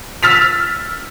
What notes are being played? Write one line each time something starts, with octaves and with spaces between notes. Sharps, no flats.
E6 F6 A6 B6 F7